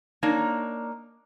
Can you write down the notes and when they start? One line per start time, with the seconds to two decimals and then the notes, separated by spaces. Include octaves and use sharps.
0.23 A#3 D4 D#4 C#5